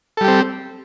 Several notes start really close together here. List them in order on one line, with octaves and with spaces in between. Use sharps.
A4 G3 G4 C4